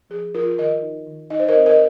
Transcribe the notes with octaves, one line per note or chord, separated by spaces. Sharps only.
F3 G#4
F3 F4 A#4
D#3 A#4 D#5
D#4
D#3
D#4 D#5
C5
A#4 D#5
C4
A#4 D#5